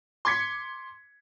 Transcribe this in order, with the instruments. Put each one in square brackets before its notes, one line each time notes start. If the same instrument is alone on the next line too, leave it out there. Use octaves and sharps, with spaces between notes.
[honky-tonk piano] C6 D6 G#6 B6 C#7